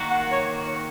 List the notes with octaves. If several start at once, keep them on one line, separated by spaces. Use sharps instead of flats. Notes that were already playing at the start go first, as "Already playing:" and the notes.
Already playing: D#3 A#3 F#4
F#5
C#5